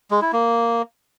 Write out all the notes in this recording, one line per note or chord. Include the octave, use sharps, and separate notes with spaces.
G#3
E4
A#3